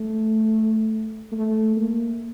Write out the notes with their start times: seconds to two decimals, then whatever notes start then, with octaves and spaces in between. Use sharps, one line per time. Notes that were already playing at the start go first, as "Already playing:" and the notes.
Already playing: A3
1.32 A3
1.77 A#3